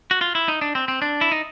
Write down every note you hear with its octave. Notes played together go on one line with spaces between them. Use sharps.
F#4
F4
E4
D#4
D4
C4
C4
D4
E4
D#4